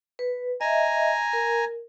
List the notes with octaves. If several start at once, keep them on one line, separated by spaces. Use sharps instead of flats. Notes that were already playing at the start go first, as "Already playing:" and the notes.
B4
D#5 E5 G#5 A#5
A#4